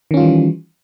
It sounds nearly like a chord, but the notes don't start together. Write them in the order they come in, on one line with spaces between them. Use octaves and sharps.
D#3 C#4 F4 G3 E3